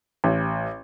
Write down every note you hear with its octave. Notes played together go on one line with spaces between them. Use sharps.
A1